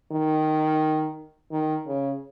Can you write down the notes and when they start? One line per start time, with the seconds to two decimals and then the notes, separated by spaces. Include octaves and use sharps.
0.12 D#3
1.52 D#3
1.87 C#3